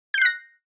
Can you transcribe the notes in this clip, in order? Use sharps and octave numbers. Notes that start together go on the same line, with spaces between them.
F#6 G6 A#6 C7